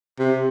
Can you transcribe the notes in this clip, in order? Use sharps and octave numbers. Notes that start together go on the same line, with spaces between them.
C3